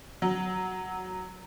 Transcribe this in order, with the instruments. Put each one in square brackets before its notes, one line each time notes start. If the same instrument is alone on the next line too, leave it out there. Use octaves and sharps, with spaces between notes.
[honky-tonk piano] F#3